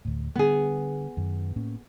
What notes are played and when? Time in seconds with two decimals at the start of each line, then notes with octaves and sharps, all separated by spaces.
0.05 D2 A2
0.36 D3 G3 B3 G#4
1.17 F#2 D#3
1.56 A2 A#3 C#4